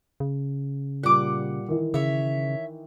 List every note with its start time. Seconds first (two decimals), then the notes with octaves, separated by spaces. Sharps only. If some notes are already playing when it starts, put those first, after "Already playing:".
0.20 C#3
1.03 A#2 G3 F#5 D6
1.68 D#3 E3
1.94 C#3 C#5 E5